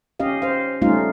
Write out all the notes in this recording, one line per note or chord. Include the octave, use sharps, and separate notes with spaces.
C#4 G4 D#5 F5
C5 F5
G3 A3 C#4 D#4 F4 F5